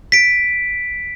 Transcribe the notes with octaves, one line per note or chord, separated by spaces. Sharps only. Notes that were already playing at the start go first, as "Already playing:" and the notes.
B6 D7